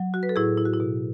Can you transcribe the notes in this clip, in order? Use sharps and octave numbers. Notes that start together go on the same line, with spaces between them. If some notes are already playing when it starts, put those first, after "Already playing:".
Already playing: F#3
F#4
B4
A4
A2 E4 G#4
E4
F#4
E4
B2